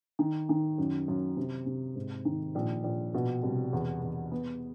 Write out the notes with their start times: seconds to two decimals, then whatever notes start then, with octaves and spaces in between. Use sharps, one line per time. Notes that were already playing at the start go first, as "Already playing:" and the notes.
0.19 D#3
0.49 D#3
0.78 F#2
1.08 F#2
1.37 C3
1.66 C3
1.96 G#2
2.25 D#3
2.55 A#1
2.84 A#1
3.14 B2
3.43 C2
3.73 E2
4.02 E2
4.32 B3